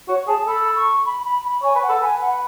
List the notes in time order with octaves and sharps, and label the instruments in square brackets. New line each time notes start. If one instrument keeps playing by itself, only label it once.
[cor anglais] F#4 [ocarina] C#5
[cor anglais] G#4 [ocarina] A5
[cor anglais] A4 [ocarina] B5
[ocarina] C#6
B5
B5
B5
[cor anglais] C#5 [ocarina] G#5
[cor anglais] B4
[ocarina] F#5
[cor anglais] A4
[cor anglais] B4 [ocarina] G#5
[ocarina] F#5